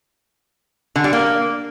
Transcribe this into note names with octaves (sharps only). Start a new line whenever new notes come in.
D3
G3
A#3